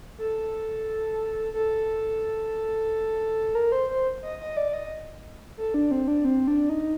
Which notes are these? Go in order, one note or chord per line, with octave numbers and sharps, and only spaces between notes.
A4
A4
A#4
C5
C5
D#5
D#5
D5
D#5
A4
D4
C4
D4
C4
D4
D#4